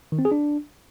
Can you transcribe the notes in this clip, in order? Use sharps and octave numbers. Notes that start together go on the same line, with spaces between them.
D#3
C4
G#4
D4